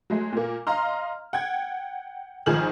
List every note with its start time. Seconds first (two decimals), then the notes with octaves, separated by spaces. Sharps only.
0.10 F#3 G#3 A3
0.33 A#2 A#3
0.67 D#5 F5 A#5 C6 F6
1.33 F#5 G5 G#6
2.46 G#1 D#3 F3 G#4 F6 F#7